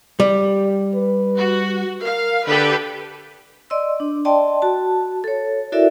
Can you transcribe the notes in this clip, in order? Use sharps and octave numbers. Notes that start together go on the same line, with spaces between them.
G3 G4
B4
F#4
A#4 F5
D3 G4 A4 B4
D5 D#5 C6 E6
D4
D5 D#5 G5 A5 C6
F#4 A5
A4 C#5
E4 F#4 A4 A#4 D5 E5